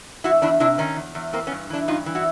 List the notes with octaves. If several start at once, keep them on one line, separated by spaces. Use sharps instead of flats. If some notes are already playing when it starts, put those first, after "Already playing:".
E2 E4 F#4
E2 D4 E4
C3 D4 E4
D#3 C#4 D#4
E2
E2
E3 A#3 C4
B3 C#4
G2
E3 D4 E4
G2 D#4 F4
E3
E4 F#4